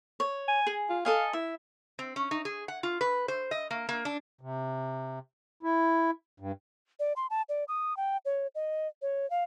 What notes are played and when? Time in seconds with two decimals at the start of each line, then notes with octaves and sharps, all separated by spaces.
0.20 C#5
0.48 G#5
0.67 G#4
0.89 F4
1.05 A4 D#5 F5 G#5
1.33 E4 E5
1.99 C4
2.16 C#4
2.31 D#4
2.45 G#4
2.68 F#5
2.83 F4
3.01 B4
3.28 C5
3.51 D#5
3.71 A#3
3.89 A#3
4.05 D4
4.41 C3
5.63 E4
6.40 G2
7.00 D5
7.16 C6
7.30 A5
7.49 D5
7.68 D#6
7.97 G5
8.25 C#5
8.55 D#5
9.02 C#5
9.30 F5